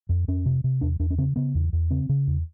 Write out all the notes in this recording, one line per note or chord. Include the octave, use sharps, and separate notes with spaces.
F2
F2 C#4
C3
C3
E2 D4
E2 D4
C#4
C#3 C4
C#3 B3
E2
E2
C#3 C4
C#3
E2